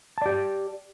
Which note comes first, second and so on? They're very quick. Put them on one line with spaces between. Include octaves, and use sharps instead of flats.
A5 D5 G4